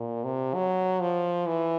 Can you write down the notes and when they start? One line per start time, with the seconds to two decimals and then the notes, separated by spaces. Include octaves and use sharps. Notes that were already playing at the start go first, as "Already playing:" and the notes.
Already playing: A#2
0.24 C3
0.55 F#3
1.01 F3
1.47 E3